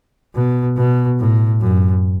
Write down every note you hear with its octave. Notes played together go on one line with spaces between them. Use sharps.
B2
B2
A2
F#2